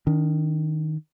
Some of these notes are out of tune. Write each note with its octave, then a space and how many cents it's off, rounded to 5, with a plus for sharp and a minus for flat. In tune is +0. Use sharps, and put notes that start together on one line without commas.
D#3 +0 D4 -35